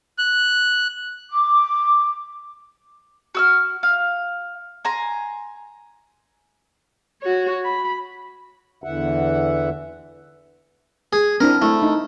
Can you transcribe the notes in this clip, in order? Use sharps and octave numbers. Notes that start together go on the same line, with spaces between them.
F#6
D6
F#4 E6 F6
F5
G#5 A#5 C6
F#4 C#5
B5
E2 D3 E3 E5 F#5
G#4
C4 D4 E4 A#4
A3 E4
D#4